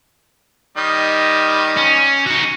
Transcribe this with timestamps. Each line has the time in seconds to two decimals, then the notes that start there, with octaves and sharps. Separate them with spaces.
0.77 D#3 G3 D#5
1.77 C#4
2.26 D#4 F#4